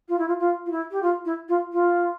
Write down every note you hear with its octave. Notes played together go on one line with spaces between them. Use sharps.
F4
E4
F4
F4
F4
E4
G4
F4
E4
F4
F4